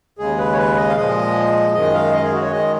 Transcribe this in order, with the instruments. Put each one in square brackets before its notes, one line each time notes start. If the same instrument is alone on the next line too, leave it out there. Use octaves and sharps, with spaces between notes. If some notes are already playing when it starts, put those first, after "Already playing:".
[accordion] D#2 C#3 G#3 G#4
B4
C#5
B4
D#5
F5
A#2 F3 G#3 D#5
F#2 D#3 G#3 D#5
F5
D#5
G#4
F#4
C#5
D#3 G#3 D#5